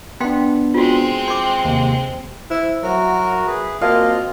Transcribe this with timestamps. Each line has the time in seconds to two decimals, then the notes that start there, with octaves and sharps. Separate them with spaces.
0.21 B3 D4 F5 G5 C6
0.74 G#3 C4 F4 F#4
1.28 G5 C6 D6
1.65 D#2 C3
2.50 E4 C5 E6
2.83 F#3 F#4 A#4 E5
3.47 G#4 B4
3.81 A#3 C4 F4 F#4 D#5 F5 A5